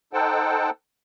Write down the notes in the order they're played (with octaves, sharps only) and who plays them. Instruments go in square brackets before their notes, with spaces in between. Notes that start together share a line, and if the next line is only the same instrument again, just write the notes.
[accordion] D#4 A4 C5 F#5 G5 A5